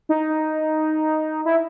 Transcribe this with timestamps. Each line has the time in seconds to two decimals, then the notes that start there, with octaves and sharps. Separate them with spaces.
0.09 D#4
1.45 E4